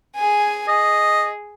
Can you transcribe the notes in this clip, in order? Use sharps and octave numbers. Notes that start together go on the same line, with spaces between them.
G#4 G#5
G#4 D#5